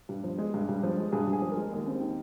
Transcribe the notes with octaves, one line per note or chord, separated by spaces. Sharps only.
G2
F3
G#3
G2
G2
F3
G#3
G2 G#4
G2
G#4
F3
A#4
G#3
D#2
C4
D#3